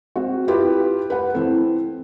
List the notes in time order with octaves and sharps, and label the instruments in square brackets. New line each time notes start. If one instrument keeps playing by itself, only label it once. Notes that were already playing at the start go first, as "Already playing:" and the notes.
[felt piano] C4 F#4
E4 F4 G4 B4
B4 F#5
E3 C4 A4